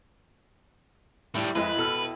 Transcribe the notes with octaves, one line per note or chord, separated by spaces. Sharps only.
A2 G3 E4
F2 G#3 E4 B4 D#5 G5
B2 A4 F6